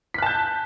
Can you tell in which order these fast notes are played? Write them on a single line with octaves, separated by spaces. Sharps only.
B6 F#6 A5 G6